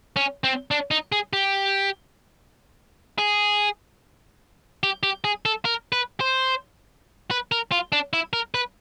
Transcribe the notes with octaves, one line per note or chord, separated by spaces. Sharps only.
C#4
C4
D4
D#4
G#4
G4
G#4
G4
G4
G#4
A4
A#4
B4
C5
B4
A#4
F4
D4
E4
A#4
B4